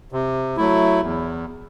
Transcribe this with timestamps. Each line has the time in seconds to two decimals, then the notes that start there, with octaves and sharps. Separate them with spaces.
0.12 C3
0.57 F#3 A3 E4
1.01 E2